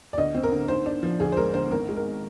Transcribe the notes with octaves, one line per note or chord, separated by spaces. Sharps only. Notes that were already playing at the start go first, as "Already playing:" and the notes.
D5
D2 D#5
C4
A#4
D3
G#2 C5
D4
F3
D2 G#4
C5
G#3 A#4
D3 C5
G#1 A#4
G#3
A#4